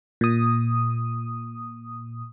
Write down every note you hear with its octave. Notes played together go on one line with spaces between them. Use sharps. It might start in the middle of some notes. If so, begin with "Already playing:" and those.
A#2 D#6